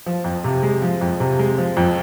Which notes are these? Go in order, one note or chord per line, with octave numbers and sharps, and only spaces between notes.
F3
F2
C3
G#3
F3
F2
C3
G#3
F3
F2